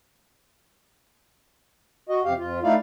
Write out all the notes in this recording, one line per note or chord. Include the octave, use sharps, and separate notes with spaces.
F#4 D#5
F2 C3 G4 F5
F2 F4
A3 D#4 E4 D5 F5